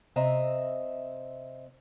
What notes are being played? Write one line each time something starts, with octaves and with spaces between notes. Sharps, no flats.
C3 C4 D#5 E5 A#5